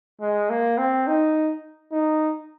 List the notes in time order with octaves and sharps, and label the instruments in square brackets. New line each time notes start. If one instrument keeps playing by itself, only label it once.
[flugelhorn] G#3
A#3
C4
D#4
D#4